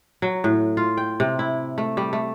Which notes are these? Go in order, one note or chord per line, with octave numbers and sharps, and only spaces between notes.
F#3
A2
F4
G5
C3
E4
A3
G3
A3